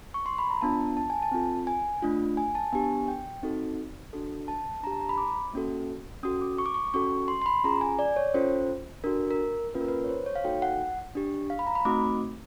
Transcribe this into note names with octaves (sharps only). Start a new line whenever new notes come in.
C#6
C6
B5
A#5
B3 D4 F4 A5
A5
G#5
A5
C4 F4 A4
G#5
A3 D4 F4
G#5
A5
B3 D4 G4 G#5
G5
C4 D#4 F#4 A4
D4 F#4 A4
A5
D4 G4 A5 A#5
A#5
B5
D6
A#3 C#4 F#4 A4
C#4 F#4 A4 D#6
D6
C#6
D6
C#6
C#4 F#4 A4 C#6
C6
C6
B5
C#4 F4 G#4 A#5
G#5
D5
C#5
C#4 F4 A4 C5
D4 F#4 A4 A#4
A#4
A#3 C#4 F4 B4
A#4
B4
C#5
C5
C#5
F5
A#3 D#4 F#4 A4 G5
F#5
D4 G4
F5
B5
A#5
B5
A3 C4 D#4 F#4 D6